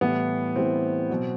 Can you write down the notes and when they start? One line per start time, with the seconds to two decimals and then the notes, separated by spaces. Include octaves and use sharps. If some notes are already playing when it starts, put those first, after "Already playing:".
0.01 A2 E3 G3 B3
0.56 A2 E3 G3 C4
1.10 B2 F#3